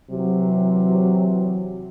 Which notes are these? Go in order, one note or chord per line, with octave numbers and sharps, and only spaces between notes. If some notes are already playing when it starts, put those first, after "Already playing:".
C3 E3 F#3